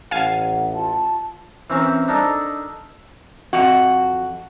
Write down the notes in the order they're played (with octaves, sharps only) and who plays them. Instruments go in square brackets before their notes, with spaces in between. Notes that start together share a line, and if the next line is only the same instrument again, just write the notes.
[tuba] A1 [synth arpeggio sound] F5 G#5 [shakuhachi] F#5
[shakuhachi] F4 [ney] A5
[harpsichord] E3 C4 C#4 A#4 C5
D4 D#4 A4 A#4
[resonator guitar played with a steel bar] F2 F#4